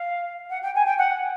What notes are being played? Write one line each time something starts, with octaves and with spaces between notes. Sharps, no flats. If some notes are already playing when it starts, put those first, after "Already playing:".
Already playing: F5
F#5
G5
G#5
G5
F#5